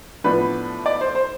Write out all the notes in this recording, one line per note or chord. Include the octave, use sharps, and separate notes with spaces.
A2 F3 B3 D4 B4
D5
C5
C5